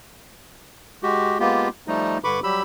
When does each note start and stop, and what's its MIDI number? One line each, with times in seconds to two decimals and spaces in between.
1.03 1.38 56
1.03 1.38 66
1.03 1.38 67
1.40 1.68 56
1.40 1.68 58
1.40 1.68 59
1.40 1.68 65
1.40 1.68 67
1.87 2.18 53
1.87 2.18 55
1.87 2.18 57
1.87 2.18 63
2.24 2.40 43
2.24 2.40 50
2.24 2.40 71
2.24 2.40 83
2.24 2.40 85
2.24 2.40 86
2.44 2.62 54
2.44 2.62 55
2.44 2.62 67
2.44 2.62 83
2.44 2.62 88